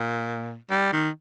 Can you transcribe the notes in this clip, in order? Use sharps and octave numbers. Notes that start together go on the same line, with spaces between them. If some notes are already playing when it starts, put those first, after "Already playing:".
Already playing: A#2
G3
D#3